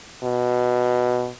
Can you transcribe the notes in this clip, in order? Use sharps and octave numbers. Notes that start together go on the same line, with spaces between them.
B2